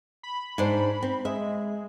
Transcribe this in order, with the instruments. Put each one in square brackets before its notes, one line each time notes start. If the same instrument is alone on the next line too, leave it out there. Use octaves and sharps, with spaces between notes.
[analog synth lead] B5
[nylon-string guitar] G#2 D4 C5
C4
[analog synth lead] G#3 [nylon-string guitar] E5